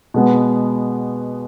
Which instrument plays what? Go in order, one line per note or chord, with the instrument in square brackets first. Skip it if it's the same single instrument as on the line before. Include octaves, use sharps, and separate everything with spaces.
[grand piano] B2 G#3 B3